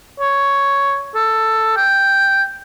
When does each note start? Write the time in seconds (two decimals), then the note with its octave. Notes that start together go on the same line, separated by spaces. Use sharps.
0.20 C#5
1.15 A4
1.77 G5